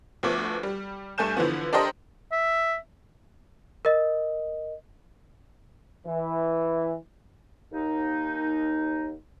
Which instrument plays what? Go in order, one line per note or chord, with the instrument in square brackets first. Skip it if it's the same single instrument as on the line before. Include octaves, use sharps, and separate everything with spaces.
[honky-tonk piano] D2 F3 A3 B3 D6
G3
G2 A3 A4 G#5 G6 E7
D3 E3 F3 B3
D4 G4 A4 A#4 C5 D#5
[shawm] E5
[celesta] A#4 D#5
[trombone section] E3
[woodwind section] D#2 D#4